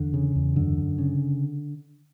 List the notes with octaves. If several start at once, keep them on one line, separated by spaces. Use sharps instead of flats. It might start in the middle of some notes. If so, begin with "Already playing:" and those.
Already playing: E2 D3
C#3
E2
F#2 D3
F#2
C#3